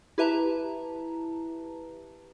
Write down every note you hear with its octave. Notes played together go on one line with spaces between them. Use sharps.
E4 G4 B4 E5 A5 A#5